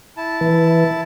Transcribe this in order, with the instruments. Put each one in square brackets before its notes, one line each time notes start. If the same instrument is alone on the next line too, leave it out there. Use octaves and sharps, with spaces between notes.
[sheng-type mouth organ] E4 A5
[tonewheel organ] E3